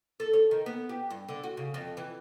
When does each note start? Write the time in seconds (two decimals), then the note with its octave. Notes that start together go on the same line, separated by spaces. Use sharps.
0.20 A4
0.33 C#5
0.51 D#3
0.66 B3
0.89 G4
1.10 G2
1.29 D3
1.44 F#4
1.57 C#3
1.74 F2
1.97 E3